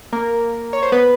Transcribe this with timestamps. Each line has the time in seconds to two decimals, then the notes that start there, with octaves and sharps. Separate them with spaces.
0.13 A#3 A#4
0.73 C#5
0.83 C5
0.92 B3 B4